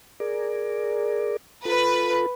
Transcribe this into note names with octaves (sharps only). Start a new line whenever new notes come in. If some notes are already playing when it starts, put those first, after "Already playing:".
G#4 A#4 D5
F4 A4 B4